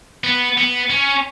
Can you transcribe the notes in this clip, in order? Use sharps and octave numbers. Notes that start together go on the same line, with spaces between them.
B3
B3
C#4